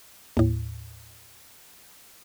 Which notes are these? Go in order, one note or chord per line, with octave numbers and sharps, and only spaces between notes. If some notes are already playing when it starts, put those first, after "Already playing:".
D#2 A2